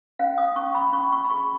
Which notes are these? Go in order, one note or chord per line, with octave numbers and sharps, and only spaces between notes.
C#4 F5
D#6
C#4 C#6
B5
C#4 C#6
C#6
B5
G#4 C#6